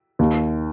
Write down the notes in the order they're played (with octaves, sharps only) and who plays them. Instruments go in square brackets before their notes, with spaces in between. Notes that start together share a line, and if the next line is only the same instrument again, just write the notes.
[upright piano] D#2